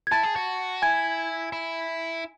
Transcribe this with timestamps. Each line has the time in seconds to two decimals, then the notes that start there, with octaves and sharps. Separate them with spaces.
0.07 G#6
0.12 E4 A5 A6
0.23 G#4
0.36 F#4
0.82 E4 G#5 G#6
1.53 E4